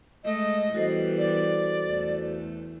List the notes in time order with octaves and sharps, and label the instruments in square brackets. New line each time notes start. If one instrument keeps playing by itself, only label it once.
[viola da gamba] G#3 A3 [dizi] D#5
[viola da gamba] E3 G3 B3 [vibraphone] F#4 A4 C5
[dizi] D5
[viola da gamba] E2 A3